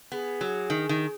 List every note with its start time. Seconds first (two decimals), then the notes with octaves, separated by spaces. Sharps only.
0.12 B3 G#4
0.41 F#3
0.70 D#3
0.89 D#3